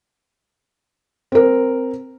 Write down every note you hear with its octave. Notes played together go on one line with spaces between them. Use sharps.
C4 A#4